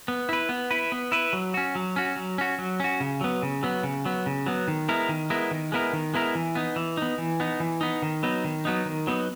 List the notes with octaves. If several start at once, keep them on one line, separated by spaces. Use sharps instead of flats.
B3
E4 B4
B3
E4 B4
B3
E4 B4
F#3
C#4 F#4
F#3
C#4 F#4
F#3
C#4 F#4
F#3
C#4 F#4
C#3
F#3 B3
C#3
F#3 B3
C#3
F#3 B3
C#3
F#3 B3
D#3
G#3 B3 E4 A#4
D#3
G#3 B3 E4 A#4
D#3
G#3 B3 E4 A#4
D#3
G#3 B3 E4 A#4
E3
B3 D#4
E3
B3 D#4
E3
B3 D#4
E3
B3 D#4
D#3
F#3 B3 D#4
D#3
F#3 B3 D#4
D#3
F#3 B3 D#4